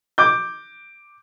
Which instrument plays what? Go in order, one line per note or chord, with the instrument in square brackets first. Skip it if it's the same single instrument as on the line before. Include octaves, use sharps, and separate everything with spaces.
[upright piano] D6 G6